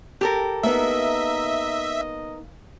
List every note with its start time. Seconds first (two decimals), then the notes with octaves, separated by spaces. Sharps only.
0.21 G4 A4 A#4
0.63 A#3 B3 D#4 D#5 E5